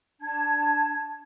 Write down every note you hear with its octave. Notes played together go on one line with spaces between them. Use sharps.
D4 A5 G#6